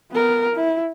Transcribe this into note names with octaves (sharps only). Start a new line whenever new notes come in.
B3 A#4
E4